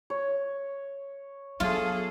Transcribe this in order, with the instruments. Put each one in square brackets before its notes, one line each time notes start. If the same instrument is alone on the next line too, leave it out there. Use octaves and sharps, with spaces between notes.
[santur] C#5
[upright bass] F#3 B3 [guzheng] F4 [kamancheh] G#4 A4